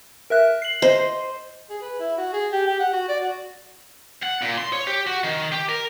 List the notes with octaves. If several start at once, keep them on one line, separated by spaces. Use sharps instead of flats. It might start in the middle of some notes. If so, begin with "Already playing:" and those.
A#4 E5 F#6
C7 F#7
C5 D#5
G#4
B4
E4
F#4
G#4
G4
G4
F#5
F#4
D5
F#4
F#5
A#2
C6
C#5
G4
F#4
D#3
G4
A#4